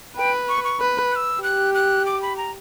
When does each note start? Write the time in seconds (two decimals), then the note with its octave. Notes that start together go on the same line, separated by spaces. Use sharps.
0.17 B4 G5
0.49 C#6
0.64 C#6
0.80 B4
1.11 F#6
1.16 E6
1.43 G4 F#6
1.75 F#6
2.06 D6
2.22 B5
2.37 A#5